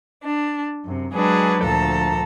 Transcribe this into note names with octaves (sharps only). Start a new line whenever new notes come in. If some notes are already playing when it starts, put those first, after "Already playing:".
D4
F#2 C3
F#3 G#3 D4 G#4 B4
D2 A#2 F3 A4 A5 A#5